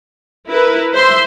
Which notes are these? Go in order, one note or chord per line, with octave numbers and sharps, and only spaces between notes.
E4 A#4 B4
C5 E5 C6